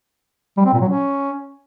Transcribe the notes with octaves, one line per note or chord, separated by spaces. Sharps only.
G3
C4
A#2
F#3
C#4